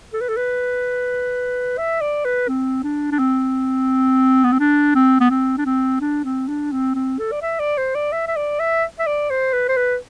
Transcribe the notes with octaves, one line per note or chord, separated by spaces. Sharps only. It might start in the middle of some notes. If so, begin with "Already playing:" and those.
A4
B4
A4
B4
E5
D5
B4
C4
D4
D4
C4
B3
C4
D4
C4
B3
C4
D4
C4
D4
C4
D4
C4
C4
A4
D5
E5
D5
C5
D5
E5
E5
D5
E5
E5
D5
C5
B4
C5
B4